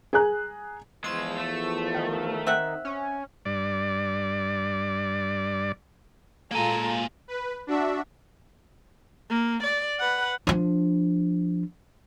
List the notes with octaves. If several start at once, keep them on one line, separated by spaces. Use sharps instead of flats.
G#4 G#5 A#5 F#6
E2 F3 G#3 F4 E6
A3
D#3
C4 E5 F#5
C#4
G2 D5
A#2 G#3 A#3 F4 A4 G#5 A#5
B4
D4 F#4 E5
A#3
D5
B4 F#5
F3 D4